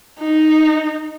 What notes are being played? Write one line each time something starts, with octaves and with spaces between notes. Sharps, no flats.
D#4